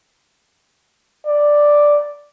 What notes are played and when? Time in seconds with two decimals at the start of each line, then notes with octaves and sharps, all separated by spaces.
1.27 D5